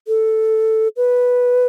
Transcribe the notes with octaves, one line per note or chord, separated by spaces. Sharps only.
A4
B4